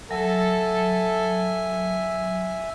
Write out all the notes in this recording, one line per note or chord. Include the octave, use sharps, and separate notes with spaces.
F#3 A4 E5 G#5